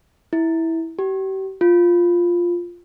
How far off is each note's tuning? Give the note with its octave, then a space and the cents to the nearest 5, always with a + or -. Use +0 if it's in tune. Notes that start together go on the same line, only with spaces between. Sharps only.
E4 -15
G4 -40
F4 +0